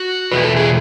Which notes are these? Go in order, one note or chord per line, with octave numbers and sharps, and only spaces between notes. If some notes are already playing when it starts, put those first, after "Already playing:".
Already playing: F#4
E2 B2 A3 B4
A4
G#4